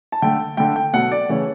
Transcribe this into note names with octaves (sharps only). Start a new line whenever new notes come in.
A5
D3 A3 G5
D3 A3 G5
G5
B2 F#3 A3 F#5
D5
C#3 E3 A3 C#5